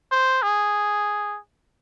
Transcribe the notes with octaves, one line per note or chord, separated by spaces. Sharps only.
C5
G#4